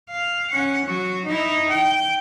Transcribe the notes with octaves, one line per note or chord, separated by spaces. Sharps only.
F5
C#4 F#5
F#3 F#4
D#4 E4
G5